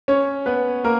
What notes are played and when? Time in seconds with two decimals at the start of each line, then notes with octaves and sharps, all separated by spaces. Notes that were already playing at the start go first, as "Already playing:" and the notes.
0.08 C#4 C#5
0.46 B3 B4
0.84 A#3 A#4